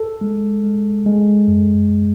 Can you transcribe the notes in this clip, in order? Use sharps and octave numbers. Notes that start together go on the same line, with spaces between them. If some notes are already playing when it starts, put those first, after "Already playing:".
Already playing: A4
G#3
G#3
G#3
F#2